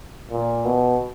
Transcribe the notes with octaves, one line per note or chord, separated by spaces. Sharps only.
A#2
B2